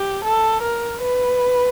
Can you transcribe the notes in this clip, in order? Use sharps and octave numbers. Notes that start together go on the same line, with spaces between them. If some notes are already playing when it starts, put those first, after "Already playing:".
Already playing: G4
A4
A#4
B4